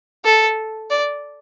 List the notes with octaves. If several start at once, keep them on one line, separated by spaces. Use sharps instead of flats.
A4
D5